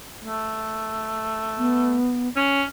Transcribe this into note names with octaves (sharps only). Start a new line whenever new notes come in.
A3
B3
C#4